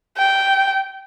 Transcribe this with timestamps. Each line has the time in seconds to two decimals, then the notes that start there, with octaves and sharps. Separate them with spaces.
0.18 G5